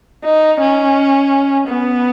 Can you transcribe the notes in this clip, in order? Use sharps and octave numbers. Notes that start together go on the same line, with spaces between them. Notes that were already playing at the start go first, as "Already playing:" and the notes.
D#4
C#4
B3